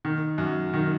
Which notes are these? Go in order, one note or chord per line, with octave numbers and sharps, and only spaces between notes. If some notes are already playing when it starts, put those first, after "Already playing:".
D#3
F#2
D#3